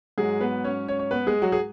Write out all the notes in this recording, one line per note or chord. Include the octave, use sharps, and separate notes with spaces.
G#2 F#3 G#3 G#4
B3 B4
C#4 C#5
C#4 C#5
C#5
B3 B4
G#3 G#4
F#3 F#4
G#4